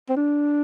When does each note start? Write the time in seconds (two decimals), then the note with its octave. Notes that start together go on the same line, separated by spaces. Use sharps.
0.09 C4
0.17 D4